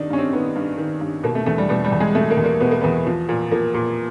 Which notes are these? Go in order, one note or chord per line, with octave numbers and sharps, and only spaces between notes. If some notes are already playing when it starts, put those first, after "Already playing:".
Already playing: G2 D#3 D4 D#4
G2 C#4
C4
D#3 B3
G2
D#3
G2
B2 A#3
A3
E2 A3
G3
B2 G3
G3
E2
G#3
B2 A3
A#3
E2
A#3
B2 B3
A#3
E2 B3
F3
A#2
F3 A#3
A#2